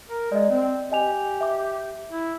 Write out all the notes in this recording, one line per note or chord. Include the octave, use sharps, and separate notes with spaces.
A#4
G#3 D5 D#5
C4
G4 D#5 G#5 F7
E5 D6
E4